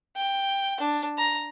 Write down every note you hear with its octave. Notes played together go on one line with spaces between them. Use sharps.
G5
D4
A#5